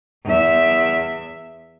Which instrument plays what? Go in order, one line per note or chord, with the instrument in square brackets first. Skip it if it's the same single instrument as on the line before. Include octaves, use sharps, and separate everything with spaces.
[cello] E2 E5